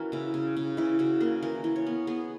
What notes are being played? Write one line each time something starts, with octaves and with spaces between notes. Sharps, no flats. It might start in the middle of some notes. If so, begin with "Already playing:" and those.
Already playing: E3 C#4 F#4 A#4
C#3 E4
C#3
C#3
E3 E4
C#3 F#4
A#3 G#4
E3 A#4
E3
C#5
B3
B3 G#4